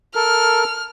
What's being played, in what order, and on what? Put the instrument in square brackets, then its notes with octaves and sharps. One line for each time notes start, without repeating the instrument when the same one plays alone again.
[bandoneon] A4 A#4 [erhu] F6